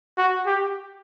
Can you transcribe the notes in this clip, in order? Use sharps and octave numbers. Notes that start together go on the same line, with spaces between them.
F#4
G4